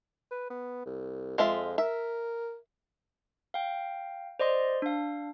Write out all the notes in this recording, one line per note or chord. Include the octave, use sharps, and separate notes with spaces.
B4
B3
C2
F2 G#3 F4 E5
A#4 E5
F5 G5
C5 D5 D#5 C6
D4 F5